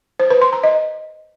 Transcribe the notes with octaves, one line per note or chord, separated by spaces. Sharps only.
C5
B4
C6
A#5
D#5